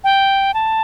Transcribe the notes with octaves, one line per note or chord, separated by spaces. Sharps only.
G5
A5